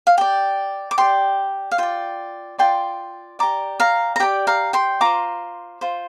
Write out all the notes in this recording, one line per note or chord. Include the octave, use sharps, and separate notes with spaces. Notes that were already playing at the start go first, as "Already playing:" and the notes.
F5
G4 D5 G5
D6
G4 D5 G5 C6
F5
F4 D5 G5
F4 D5 G5 C6
G4 D5 A#5 D6
F5 A#5
A#5
G4 D5 G5
F5 A#5
G5 C6
F4 C5 A#5 D6
F4 C5